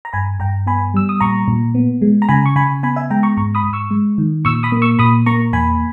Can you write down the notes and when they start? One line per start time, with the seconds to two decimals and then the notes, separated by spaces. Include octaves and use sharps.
0.05 A#5
0.13 G2 G#5 B5
0.39 G2 G5 A#5
0.66 B3 G#5 B5
0.94 G3 E6
1.09 D#6
1.20 A#2 A#5 C#6
1.48 A#2
1.75 B3
2.02 G#3
2.22 A#5
2.29 C#3 G#5 B5
2.46 C#6
2.56 C#3 G#5 B5
2.83 B3 G#5 B5
2.96 E5 G#5
3.10 G#3 G5 A#5
3.23 A#5 C#6
3.37 G#2 A#5 C#6
3.55 B5 D#6
3.64 G#2
3.73 C#6 E6
3.91 G#3
4.18 D#3
4.45 A#2 C#6 E6
4.63 B5 D#6
4.72 A#3
4.82 C#6 E6
4.99 A#2 B5 D#6
5.26 A#3 A#5 C#6
5.53 E2 G#5 B5